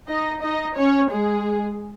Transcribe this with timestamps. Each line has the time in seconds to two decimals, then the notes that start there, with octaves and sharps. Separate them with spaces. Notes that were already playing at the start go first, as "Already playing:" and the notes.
0.09 D#4 D#5
0.42 D#4 D#5
0.77 C#4 C#5
1.11 G#3 G#4